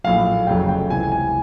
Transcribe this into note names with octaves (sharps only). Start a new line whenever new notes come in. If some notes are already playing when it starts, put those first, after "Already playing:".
A#1 A2 F#3 F5
F1 F2 C#3 F#3 A3 G5
G5
C#2 C3 E3 G#5
G#5